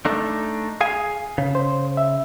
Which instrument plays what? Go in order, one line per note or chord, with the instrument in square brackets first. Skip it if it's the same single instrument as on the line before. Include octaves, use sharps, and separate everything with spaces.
[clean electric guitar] A3 D4 D#4
G#4 F5 G#5
C#3
[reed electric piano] C5
E5